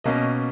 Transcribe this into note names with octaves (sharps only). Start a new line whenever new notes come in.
B2 A#3 C#4 D#5